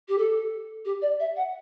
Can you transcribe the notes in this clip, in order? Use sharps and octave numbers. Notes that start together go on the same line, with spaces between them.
G4
A4
G4
D5
E5
F#5